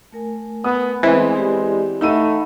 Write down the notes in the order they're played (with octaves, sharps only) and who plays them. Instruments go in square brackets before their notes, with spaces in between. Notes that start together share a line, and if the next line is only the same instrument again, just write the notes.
[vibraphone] A3 A#4 G#5
[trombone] B3 [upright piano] D#6
[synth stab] E3 [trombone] G#3 [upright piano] B3 C4
[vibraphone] E4 G4 D5
[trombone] A3 [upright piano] D#4 E6 D#7 [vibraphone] F5 F#5 B5